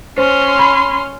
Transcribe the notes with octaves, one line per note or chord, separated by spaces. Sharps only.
C#4 C5 C6
B5